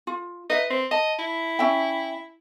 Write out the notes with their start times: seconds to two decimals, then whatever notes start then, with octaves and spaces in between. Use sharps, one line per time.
0.07 F4
0.50 B4 D#5 E5
0.70 C4
0.91 D#5 A5
1.19 E4
1.59 C#4 E5 G5